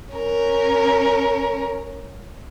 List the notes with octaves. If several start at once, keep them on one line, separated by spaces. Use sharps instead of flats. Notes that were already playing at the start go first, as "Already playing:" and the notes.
C#4 A#4